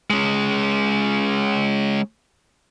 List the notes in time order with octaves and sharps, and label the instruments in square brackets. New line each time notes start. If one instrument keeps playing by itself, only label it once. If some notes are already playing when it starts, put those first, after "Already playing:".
[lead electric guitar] G#3 C#4